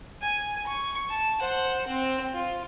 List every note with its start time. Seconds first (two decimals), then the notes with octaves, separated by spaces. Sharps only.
0.22 G#5
0.67 C#6
1.10 A5
1.40 C5 F#5
1.87 C4
2.33 F4